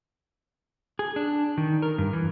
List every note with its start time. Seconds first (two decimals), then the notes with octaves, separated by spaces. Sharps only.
0.99 G#4
1.16 D4
1.58 D#3
1.82 A#4
1.98 G2
2.13 E3